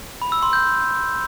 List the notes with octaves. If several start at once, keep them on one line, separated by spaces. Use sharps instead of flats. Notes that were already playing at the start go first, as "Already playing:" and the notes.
B5
E6
C6
G6